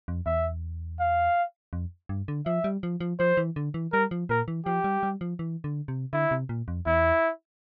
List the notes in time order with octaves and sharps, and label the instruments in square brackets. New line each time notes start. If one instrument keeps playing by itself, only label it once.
[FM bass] F2
[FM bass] E2 [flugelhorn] E5
[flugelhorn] F5
[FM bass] F2
G2
D3
[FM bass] F3 [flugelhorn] E5
[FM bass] G3
F3
F3
[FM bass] F3 [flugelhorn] C5
[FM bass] E3
D3
E3
[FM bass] G3 [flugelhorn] A#4
[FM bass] F3
[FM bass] A#2 [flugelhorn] A#4
[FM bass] E3
[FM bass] F3 [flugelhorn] G4
[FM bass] G3
G3
F3
E3
D3
C3
[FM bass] D3 [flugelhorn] E4
[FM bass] C3
A#2
F2
[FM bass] E2 [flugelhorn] E4